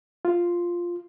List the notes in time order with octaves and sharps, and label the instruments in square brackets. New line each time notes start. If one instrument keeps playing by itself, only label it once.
[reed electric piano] F4